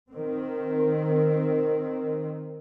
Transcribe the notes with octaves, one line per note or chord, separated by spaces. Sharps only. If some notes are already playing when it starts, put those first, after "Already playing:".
D#3 C4